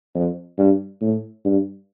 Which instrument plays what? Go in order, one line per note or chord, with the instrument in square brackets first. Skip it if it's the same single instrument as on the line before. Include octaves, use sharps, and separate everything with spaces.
[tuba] F2
G2
A2
G2